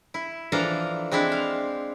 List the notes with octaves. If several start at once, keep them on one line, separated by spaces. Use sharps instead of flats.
E4
E3 F3 D4 A4 F5 A#5
G#3 C4 D4 E4
F5